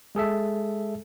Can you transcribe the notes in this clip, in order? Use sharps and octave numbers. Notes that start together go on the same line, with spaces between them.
G#3 G#4 A4 E5